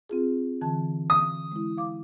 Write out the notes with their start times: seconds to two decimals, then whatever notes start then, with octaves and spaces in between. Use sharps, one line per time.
0.09 C4 F4 G#4
0.61 D3 E3 A5
1.10 D#6
1.51 G#3 E4
1.77 F5 D6